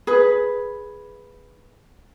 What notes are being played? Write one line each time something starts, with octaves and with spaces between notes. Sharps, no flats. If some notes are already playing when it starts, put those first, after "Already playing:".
G#4 B4